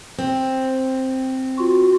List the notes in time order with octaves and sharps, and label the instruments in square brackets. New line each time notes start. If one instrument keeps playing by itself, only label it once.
[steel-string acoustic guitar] C4
[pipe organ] F4 F#4